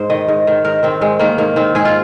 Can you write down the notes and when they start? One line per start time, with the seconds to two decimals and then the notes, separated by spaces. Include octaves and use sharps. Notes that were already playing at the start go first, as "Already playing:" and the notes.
Already playing: G#2 C5
0.10 D#3 D#5
0.28 G#2
0.47 D#3
0.65 G#2 A#4
0.83 D#3 C4
1.01 G#2 G#3
1.19 D#3 A#3
1.38 G#2 A#3
1.56 D#3 C4
1.75 G#2 G#4
1.85 F4